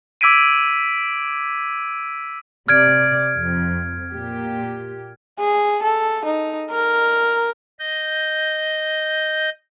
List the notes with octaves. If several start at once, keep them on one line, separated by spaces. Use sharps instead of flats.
D6 E6 G#6 B6 D7 D#7
C3 D5 F6 G#6 D7
F2
A#2 G4
G#4
A4
D#4
A#4
D#5 G6